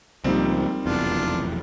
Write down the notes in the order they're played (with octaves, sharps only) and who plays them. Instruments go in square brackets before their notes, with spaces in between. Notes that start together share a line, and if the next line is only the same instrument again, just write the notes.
[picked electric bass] C#2 A#2 F3 [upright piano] G3 A#3 D#4 [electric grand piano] C4
[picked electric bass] F1 B1 E2 [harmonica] D4 F4